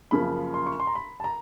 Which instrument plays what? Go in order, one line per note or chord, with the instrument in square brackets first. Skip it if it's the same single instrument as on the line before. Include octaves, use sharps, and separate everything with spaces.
[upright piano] F#2 C#3 F3 A#3 B5
C6
C#6
C6
A#5
B5
A5
A#5